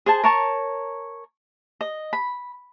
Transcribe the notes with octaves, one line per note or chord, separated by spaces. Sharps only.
G#4 C5 G#5 A5
A#4 C#5 A5
D#5
B5